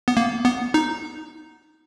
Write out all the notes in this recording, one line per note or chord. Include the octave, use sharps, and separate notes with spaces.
B3
A#3
B3
D#4